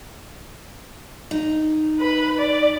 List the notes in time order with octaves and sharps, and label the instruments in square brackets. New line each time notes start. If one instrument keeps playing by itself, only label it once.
[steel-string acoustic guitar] D#4
[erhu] B4
D5